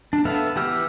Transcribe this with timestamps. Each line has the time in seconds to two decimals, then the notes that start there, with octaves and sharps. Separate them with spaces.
0.13 D4
0.25 B3 A4 B4 E5 F5
0.56 E3 G4 F#5 E6 F6